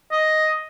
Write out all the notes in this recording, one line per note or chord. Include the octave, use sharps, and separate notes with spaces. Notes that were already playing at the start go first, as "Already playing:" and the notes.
D#5